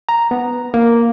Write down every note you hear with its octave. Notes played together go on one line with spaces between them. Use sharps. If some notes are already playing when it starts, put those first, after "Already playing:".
A#5
B3
A#3